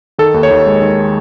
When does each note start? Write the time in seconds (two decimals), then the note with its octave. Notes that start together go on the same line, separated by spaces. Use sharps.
0.18 D#3 A4
0.34 D#2
0.43 C#5
0.51 D#2
0.67 G#3
0.82 D#3